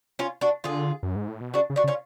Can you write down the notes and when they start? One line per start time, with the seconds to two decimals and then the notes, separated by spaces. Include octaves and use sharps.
0.19 C#4 F4
0.41 D4 F#4
0.64 D3 F4 G#4
1.03 F#2
1.16 G#2
1.28 A2
1.41 B2
1.54 C#3 D4 F#4
1.70 C#3
1.76 D4 F#4
1.84 C#3
1.88 C#4 F4